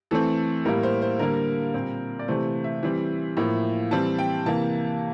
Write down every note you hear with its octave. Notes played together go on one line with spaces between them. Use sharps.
E3 A3 C4 A4
A2 G3 A#3 A#4
C5
C5
D3 G3 A#3 A#4
A#2 G3 C4
D5
C3 E3 A3 C5
E5
E3 G3 C4
A2 F3 A#3
E3 G3 C4 A5
G5
C3 E3 A#3 A5